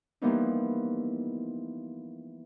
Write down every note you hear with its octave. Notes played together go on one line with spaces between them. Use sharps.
E3 F3 G3 A#3 B3 D#4